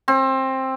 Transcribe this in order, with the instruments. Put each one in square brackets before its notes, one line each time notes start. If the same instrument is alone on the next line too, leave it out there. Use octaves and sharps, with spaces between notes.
[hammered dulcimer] C4